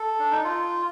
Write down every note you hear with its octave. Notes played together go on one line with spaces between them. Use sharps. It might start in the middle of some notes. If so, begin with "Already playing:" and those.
Already playing: A4
D4
D#4
F4